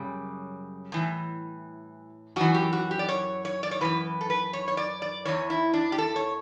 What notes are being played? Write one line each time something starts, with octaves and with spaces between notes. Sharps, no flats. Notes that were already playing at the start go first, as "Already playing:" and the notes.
Already playing: F#2 C#3 F#3 G3
A2 E3
F#2 E3 F#4
G4
F#4
G4
D5
C#5
C#5
D5
C#5
F#2 C#3 E3 B4
A4
B4
C#5
C#5
D5
D5
E2 C#3 E3 C#5
E4
D4
G4
A4
C#5